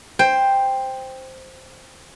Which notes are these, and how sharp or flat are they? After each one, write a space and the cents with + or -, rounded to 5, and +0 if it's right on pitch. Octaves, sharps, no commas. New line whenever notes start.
C5 +0 G5 +10